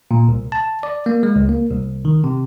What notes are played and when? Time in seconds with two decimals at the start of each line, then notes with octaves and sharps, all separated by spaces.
0.11 A#2
0.28 C2
0.52 A5
0.83 D5
1.06 A#3
1.23 G#3
1.36 C#2
1.49 A#3
1.71 C2
2.05 D#3
2.24 C3